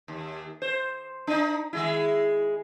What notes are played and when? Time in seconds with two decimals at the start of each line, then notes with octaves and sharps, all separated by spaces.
0.08 D#2
0.62 C5
1.27 D4 D#4
1.73 D#3 G#3 E4